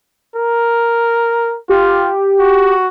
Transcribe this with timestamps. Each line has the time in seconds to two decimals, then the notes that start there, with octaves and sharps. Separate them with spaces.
0.35 A#4
1.69 F4 G4
2.39 F#4